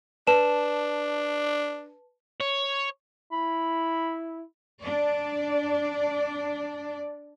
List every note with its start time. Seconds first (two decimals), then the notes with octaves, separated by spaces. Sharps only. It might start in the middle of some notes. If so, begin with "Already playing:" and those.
0.27 D4 B4 A5 E7
2.40 C#5
3.32 E4 B5
4.83 D4 D5